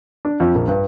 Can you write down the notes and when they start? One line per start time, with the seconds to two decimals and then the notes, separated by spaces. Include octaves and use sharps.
0.25 D4
0.40 F2
0.55 A#1
0.68 G2